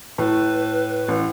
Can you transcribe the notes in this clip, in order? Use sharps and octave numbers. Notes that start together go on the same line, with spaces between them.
A2 B4
A1